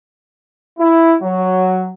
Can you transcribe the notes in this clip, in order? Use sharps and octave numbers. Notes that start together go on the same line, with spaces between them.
E4
F#3